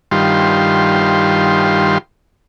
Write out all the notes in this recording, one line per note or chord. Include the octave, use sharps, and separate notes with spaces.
G2 D#3 G3 F4 C6